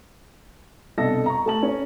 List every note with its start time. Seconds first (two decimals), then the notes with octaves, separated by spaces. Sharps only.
0.98 C2 B2 D4 A4 D#5 A#6
1.26 A#5 C#6
1.46 A3 A5 F#7
1.63 C#4